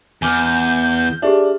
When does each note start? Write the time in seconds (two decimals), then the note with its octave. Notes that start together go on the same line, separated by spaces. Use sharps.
0.22 E2 G#5 D6 F6 G6
1.22 D4 G4 G#4 E5